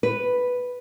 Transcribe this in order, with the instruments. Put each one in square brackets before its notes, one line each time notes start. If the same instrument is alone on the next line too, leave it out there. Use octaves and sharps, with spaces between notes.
[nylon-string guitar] B4